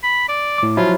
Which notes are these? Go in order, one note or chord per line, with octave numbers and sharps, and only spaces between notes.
B5
D5
A2 D6
F3 F#3 E4 F4